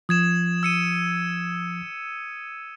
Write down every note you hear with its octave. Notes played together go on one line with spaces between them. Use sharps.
F3 D#6 G#6 E7
E6 C#7 D#7